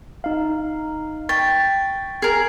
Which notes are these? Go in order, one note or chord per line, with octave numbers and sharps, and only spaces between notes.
D#4 F5
G5 C#6 A6 B6
G#4 A#4